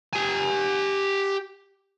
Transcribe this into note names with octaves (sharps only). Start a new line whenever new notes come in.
G4 G#5